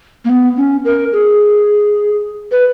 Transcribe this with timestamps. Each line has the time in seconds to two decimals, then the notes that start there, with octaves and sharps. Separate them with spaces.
0.25 A#3
0.30 B3
0.57 C#4
0.85 A#4
1.13 G#4
2.52 B4